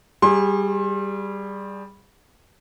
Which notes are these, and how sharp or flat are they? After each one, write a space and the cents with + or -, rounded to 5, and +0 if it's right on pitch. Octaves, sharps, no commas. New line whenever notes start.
G3 +0 G#4 -20 C6 +35